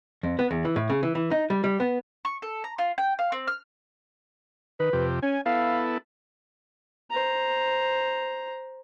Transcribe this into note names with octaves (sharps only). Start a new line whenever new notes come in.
F2
B3
E2
E3
A2
C#3
E3
E3
D#4
G3
G3
B3
C#6
A4
A#5
F4
G5
F5
C4
F6
D#3 B4
F2 C3 G4
C#4 G#5
B3 E4 A4 F5
C5 A#5